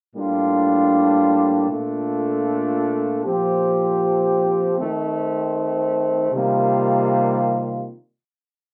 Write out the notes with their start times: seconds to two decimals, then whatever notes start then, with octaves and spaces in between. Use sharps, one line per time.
0.15 A2 G3 A#3 D4 F4
1.70 A#2 A3 D4 F4 A4
3.25 A#2 F3 C4 G4
4.78 D#3 A3 C4
6.33 C3 D#3 G3 A#3 F4